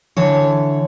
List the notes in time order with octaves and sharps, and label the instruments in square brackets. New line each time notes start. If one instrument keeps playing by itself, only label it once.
[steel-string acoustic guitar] D3 E3 C#5